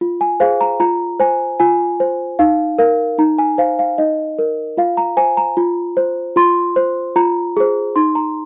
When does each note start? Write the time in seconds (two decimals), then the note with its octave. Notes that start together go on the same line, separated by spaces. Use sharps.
0.01 F4
0.21 G#5
0.40 G#4 C5 F5
0.61 A#5
0.80 F4 A#5
1.19 C5 G#5
1.60 F4 G#5
2.00 C5
2.39 D#4 F5
2.78 A#4 F5
3.18 D#4 A#5
3.38 G#5
3.58 C5 F5
3.79 F5
3.98 D#4 D#5
4.39 A#4
4.77 F4 F5
4.97 A#5
5.17 C5 G#5
5.37 A#5
5.57 F4
5.97 C5
6.36 F4 C6
6.76 C5
7.16 F4 A#5
7.57 G#4 C5
7.96 D#4 C6
8.15 A#5